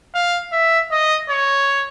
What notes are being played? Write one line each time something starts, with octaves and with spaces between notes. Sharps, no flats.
F5
E5
D#5
C#5